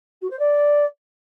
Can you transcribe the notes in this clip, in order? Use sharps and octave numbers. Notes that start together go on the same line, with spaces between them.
F#4
C5
D5